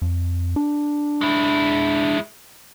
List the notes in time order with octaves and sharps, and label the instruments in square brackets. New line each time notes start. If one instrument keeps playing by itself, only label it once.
[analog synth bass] F2
D4
[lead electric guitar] G#3 E4